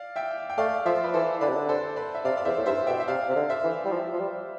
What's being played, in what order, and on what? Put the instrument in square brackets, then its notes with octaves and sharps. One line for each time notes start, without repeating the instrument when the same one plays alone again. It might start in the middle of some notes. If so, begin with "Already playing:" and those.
Already playing: [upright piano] D5 F5
E5 G5
G5
[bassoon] A3 [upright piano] D5 F5
[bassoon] F3 [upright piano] C5 E5
[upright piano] B4
[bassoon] E3 [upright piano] A4 C5
[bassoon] D3 [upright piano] B4 D5
[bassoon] C3
D3
[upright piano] A4 C5
B4 D5
E5
[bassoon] C3 [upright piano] D5 F5
[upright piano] D5
[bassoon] E2 [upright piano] C5 E5
[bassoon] A2
[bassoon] G2 [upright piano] C5 E5
[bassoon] B2 [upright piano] E5 G5
[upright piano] E5
[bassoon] C3 [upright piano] D5 F5
[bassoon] C3
D3
[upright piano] C5 E5
[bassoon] E3
G3
F3
F3
G3